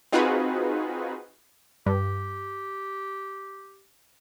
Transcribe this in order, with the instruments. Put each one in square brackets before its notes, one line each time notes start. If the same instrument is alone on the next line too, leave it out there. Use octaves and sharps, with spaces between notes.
[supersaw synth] C4 D#4 F4 F#4 G#4 B4
[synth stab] G2 [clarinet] G4